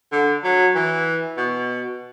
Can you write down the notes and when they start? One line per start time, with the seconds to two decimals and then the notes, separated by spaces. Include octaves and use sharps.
0.12 D3
0.44 F#3
0.75 E3
1.37 B2